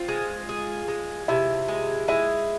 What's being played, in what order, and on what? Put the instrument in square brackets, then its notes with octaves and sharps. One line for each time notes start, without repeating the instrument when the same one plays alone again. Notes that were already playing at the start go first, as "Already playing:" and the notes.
Already playing: [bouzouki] C4 [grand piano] F4
[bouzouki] G#3
G#4
G#3
[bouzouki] C3 [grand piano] E4
[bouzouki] G#3
[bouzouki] G#3 [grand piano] E4